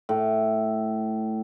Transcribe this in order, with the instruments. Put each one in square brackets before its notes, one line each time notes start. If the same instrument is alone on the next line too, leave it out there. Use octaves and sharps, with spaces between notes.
[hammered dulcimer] A2